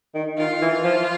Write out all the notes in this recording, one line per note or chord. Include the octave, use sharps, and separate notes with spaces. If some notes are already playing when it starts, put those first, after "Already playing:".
D#3
D#3 F4
E3
F3